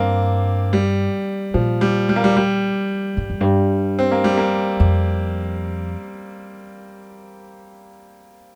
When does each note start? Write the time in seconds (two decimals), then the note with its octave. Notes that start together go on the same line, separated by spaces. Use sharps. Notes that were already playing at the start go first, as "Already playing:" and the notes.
Already playing: G2 A#3 C4 D4
0.73 G3
1.54 A#2 F3
1.81 G3
2.09 G3
2.16 A#3
2.24 G3
2.37 G3
3.17 G2
3.30 F2
3.40 G2
3.99 C4
4.12 A#3
4.24 G3
4.38 A#3
4.80 F2